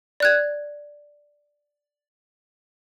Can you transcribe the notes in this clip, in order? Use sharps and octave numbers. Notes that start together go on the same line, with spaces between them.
D5 F#6 G#6